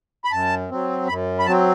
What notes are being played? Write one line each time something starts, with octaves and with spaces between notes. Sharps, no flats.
B5
F#2 A5
F#3 C4
F#2 B5
B5
F#3 C4 A5